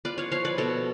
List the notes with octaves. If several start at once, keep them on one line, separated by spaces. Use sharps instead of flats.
F4 B4 D5
C#5 F5
F3 C#5 F5
B4 D5
B2 A4 C#5